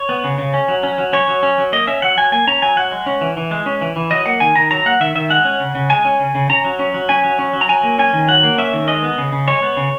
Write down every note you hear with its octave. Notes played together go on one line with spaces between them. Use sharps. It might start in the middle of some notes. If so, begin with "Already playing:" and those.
Already playing: C#5
B3
C#3
C#3
C#4
F#3
C#4
F#3
C#4 C#5
F#3
C#4
F#3
A#3 D#5
C#4 E5
F#3 F#5
F#3 G#5
A#3 G#5
C#4 A#5
F#3 G#5
F#3 F#5
G#3
C#4
E3
E3
G#3
C#4
E3
E3
F#3 D#5
A#3 F#5
D#3 G#5
D#3 A#5
F#3 A#5
A#3 F#5
D#3 E5
D#3 E5
G#3 F#5
C#4
C#3
C#3
G#3 G#5
C#4
C#3
C#3
C#4 A#5
F#3
C#4
F#3
C#4 G#5
F#3
C#4
F#3
A#5
F#3 G#5
A#3
C#4 G#5
D#3
F#3 F#5
A#3
C#4 E5
D#3
G#3 D#5
B3
C#3
C#3
G#3 C#5
B3
C#3